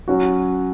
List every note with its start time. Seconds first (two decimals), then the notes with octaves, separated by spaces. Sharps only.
0.08 F#3 C#4 F#4